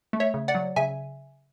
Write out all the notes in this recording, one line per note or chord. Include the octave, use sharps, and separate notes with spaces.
A3
C#5 E5
C#3
D5 F#5
F#3
C#3 E5 G#5